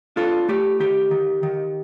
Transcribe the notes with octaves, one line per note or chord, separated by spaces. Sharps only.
D4 F4 A4
A3 G4
D#3 G4
D#3
D#3